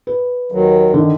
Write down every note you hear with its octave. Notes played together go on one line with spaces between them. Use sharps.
B4
D#2 D#3 F#3
D3 D#3